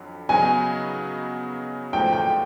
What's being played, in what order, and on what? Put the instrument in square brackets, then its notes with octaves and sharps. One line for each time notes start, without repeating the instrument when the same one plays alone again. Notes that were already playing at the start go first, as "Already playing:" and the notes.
Already playing: [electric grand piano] F2 D3 F#3
[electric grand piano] C#3 F#3 B3 D#4 F#4 [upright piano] G#5
[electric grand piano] G#2 F3 A3 C#4 F#4 [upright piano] G5
[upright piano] G5